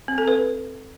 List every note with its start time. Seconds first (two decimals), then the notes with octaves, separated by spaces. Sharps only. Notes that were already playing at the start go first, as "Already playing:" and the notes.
0.08 C4
0.18 A4
0.28 B4